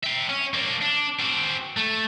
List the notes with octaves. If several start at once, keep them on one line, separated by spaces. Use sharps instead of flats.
E5 G5
C#4
A#3 D4
D4
C4 F#4
A3